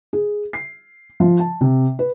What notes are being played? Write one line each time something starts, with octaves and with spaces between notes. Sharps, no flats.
G#4
C7
F3
A5
C3
B4